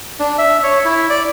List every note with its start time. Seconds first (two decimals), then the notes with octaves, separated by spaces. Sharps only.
0.20 D4
0.38 E5
0.63 C#5
0.85 E4
1.10 D5